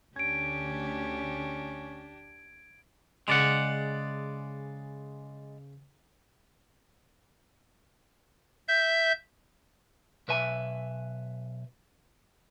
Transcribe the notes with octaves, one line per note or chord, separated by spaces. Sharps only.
D2 C#4 D4 G4 G#6 D7
C#3 G#3 D5 F#5
E5 G6
B1 B4 E5 G#5